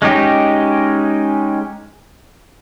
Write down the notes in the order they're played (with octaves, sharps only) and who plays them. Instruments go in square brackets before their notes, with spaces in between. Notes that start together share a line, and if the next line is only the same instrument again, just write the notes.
[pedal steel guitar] G#3 C#4 D#4 G4